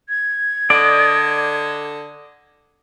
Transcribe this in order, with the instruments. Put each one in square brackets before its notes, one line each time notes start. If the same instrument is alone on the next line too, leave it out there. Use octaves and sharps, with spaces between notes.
[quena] G#6
[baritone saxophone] D3 [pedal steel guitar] D5 D#5